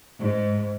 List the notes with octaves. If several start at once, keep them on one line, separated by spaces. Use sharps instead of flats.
G#2